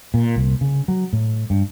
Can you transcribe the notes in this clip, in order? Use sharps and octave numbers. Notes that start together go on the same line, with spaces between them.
A#2
C2
C#3
F#3
A2
G2